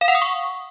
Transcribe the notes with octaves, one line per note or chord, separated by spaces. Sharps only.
F5
F#5
D#6
C#6